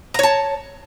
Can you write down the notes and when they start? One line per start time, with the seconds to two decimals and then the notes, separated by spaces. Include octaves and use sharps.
0.14 A#5
0.19 C#5
0.23 A5